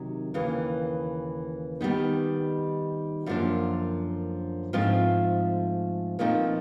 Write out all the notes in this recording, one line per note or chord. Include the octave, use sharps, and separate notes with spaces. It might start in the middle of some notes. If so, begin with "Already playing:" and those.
Already playing: C3 D#3 F#3
D#2 C#3 E3
D#3 G3 B3 D#4
F#2 D3 F3 A#3 D4
G#2 F3 A3 C4 F4
A#2 F3 A3 C4 D#4